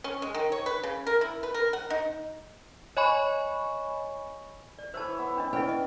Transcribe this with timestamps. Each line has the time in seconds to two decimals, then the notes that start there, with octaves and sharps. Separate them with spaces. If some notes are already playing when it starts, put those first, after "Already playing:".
0.04 C#4
0.22 G#3
0.34 D#3
0.52 C#5
0.66 B4
0.83 C#3
1.07 A#4
1.21 E4
1.43 B4
1.54 A#4
1.73 F#5
1.90 D#4
2.97 C#5 D#5 G#5 B5 C#6
4.79 D5
4.94 E3 C5 C#5 E5 A5
5.19 B3
5.37 C#4 D4 D#5
5.53 C#4 E4 B4 G5
5.69 D#5